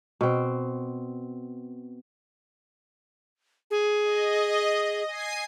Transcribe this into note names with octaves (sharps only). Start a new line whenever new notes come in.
B2 C4
G#4
D#5
G#5 C7 D#7